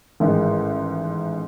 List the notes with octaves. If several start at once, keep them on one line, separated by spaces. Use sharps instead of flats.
A1 G#2 D#3 G#3